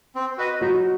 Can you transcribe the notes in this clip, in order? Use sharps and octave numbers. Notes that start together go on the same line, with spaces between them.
C4
F#4 B4 D#5
F#3 D#4 F#4